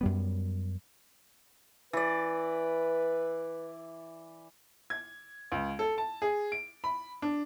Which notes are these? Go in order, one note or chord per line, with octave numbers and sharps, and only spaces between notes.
F#2 G3 B3
E3 B4 D5
G#6
C#2
A4
A5
G#4
D7
B5
D4